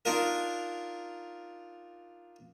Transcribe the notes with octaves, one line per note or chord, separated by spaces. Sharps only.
D4 D#4 F4 A#4